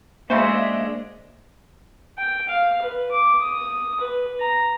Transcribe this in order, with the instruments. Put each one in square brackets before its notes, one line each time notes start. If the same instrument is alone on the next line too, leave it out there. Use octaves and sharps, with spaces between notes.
[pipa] C#3 F#4 C5 [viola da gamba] G#3 D4 [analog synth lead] A#3 [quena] E5
[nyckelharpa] G5
F5
B4
D6
D#6
B4
A#5